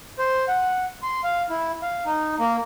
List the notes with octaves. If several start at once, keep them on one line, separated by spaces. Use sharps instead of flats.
C5
F#5
C6
F5
E4
F5
D#4
A#3